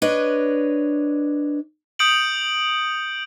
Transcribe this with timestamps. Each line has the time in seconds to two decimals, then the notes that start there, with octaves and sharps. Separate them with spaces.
0.02 D4 B4 C#5 D#5
1.99 D#6 G6 C#7 D7 F#7